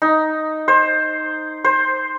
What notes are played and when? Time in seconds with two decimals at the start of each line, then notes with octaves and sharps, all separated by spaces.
0.02 D#4
0.68 C5
1.64 C5